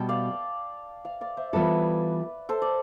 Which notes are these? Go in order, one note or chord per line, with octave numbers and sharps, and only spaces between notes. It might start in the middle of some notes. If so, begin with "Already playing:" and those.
Already playing: B2 G3 B3 G5 A5
D5 F5
D5 F5
D5 F5
C5 E5
E3 G3 B3 F4 A4 B4 D5
A4 C5
D5